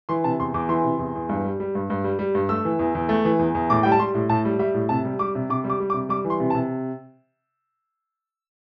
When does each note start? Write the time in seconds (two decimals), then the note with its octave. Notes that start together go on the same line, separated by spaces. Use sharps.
0.09 E3 C6
0.24 C3 A5
0.40 E2 C6
0.54 E2 D6
0.69 E3 C6
0.84 C3
0.99 E2
1.15 E2
1.29 G2
1.45 G3
1.60 G3
1.75 G2
1.90 G2
2.04 G3
2.19 G3
2.35 G2
2.49 A3 E6
2.65 E3
2.79 E2
2.95 E2
3.09 A3
3.25 E3
3.39 E2
3.55 E2
3.70 A2 D6
3.83 G3 G5
3.92 A5
3.99 G3 C6
4.14 A2
4.29 A2 A5
4.45 G3
4.59 G3 E5
4.74 A2
4.89 C3 A5
5.05 G3
5.19 G3 D6
5.35 C3
5.50 C3 D6
5.64 G3
5.70 D6
5.80 G3
5.90 D6
5.94 C3
6.09 G3 D6
6.25 E3
6.30 C6
6.40 C3
6.50 A5
6.55 C3